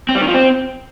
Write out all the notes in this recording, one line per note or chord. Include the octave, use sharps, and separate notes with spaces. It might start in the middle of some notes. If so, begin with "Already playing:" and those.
C4
G3
D#3
F3
C4